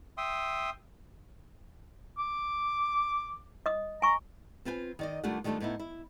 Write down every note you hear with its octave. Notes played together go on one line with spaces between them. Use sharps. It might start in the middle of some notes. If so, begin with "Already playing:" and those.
E5 G5 C6 D#6
D6
D#5 D#6
G#5 A#5 C#6
C4 F4 B4 G5 G#5
D#3 D5 D#5
D#2 G3 A3 D4 F4 F#5
D#3 G3 A3 D4 F4 A4
A2 B3 D#4 E4
E4